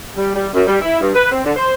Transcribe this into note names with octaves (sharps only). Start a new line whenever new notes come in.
G3
G3
F#2
G3
E4
G2
B4
C4
D3
C5